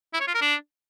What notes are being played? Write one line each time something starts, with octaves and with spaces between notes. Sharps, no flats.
E4
C#5
F4
A#4
D4